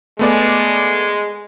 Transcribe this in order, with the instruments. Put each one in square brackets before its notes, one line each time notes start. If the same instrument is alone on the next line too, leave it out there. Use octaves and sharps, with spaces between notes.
[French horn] G#3 [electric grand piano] A3 B3 D5